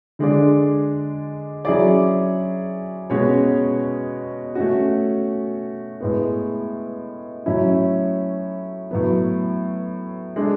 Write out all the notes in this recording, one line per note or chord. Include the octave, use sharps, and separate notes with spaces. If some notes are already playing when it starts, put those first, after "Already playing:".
D3 G#3 D4 G#4 D5
F#3 C#4 E4 G#4 D5
B2 G#3 C#4 F#4 C#5
A3 C#4 F#4
A2 G#3 B3
A2 F#3 C#4 E4
A2 F#3 B3
G#3 D4 A4